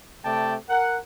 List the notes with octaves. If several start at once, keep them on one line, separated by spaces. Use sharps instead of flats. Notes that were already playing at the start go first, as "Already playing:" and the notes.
C3 A3 D5 G5 A5
A#4 F#5